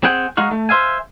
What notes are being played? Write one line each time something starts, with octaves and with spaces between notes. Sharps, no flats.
C4 G#4 F#5 G5
G#3 D#4 F#4 F5
A3
C5 E5 F5 G#5